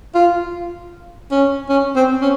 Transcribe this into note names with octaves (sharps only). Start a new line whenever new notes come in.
F4
C#4
C#4
C4
C#4